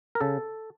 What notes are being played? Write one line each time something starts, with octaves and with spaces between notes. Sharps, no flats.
A#4
C#3 A4